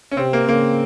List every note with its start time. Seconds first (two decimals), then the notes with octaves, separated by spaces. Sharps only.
0.11 C#4
0.17 C3 C4
0.33 A#3
0.48 C#3 A#3